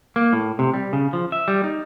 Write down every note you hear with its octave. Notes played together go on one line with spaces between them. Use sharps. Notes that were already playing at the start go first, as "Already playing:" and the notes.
A#3
A2
C3
G3
C#3
F3
E5
G3
D#4